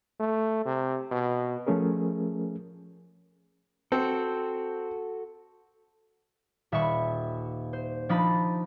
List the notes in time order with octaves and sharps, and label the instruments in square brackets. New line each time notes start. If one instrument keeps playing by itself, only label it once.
[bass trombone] A3
C3
B2
[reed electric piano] F3 A3 C#4 G#4 A#4
[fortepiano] C4 [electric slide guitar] F#4 A4
[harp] D#1 E5 B5 C#6
C5
F3 D4 D#4 B5 A6